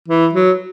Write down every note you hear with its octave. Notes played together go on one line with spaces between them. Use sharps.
E3
F#3